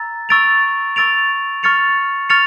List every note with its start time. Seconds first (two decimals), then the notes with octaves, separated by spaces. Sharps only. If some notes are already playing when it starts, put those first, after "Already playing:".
Already playing: A#5 E6 A6
0.29 C#6 E6 A6 D7 F7
0.96 C#6 E6 A6 D7 F7
1.63 C#6 F6 A6 C#7 F7
2.29 C#6 F6 A6 C#7 F7